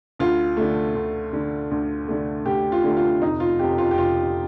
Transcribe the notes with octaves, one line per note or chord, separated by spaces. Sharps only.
D2 F4
D3 A3
D2
D3 A3
D2
D3 A3
D2 G4
F4
D3 A3
F4
F1 D#4
F4
F2 C3 G4
F4
G4
F1 F4